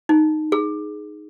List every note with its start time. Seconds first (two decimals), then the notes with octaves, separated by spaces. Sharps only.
0.09 D#4
0.52 G#4